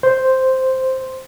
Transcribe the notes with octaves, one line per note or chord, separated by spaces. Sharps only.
C5